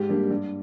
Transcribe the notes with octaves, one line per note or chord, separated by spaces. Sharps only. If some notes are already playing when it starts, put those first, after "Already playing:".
Already playing: G#2 G4
G3 A#3 D4
G2